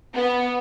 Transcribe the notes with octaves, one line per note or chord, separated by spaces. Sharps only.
B3